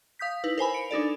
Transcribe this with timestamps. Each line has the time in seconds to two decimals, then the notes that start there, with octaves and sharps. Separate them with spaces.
0.19 F5 D#6 G6 B6
0.44 D#4 E4 B4
0.58 A#4 C5 G#5 B5
0.74 C#7 D7 F7
0.91 D4 D#4 A4 D5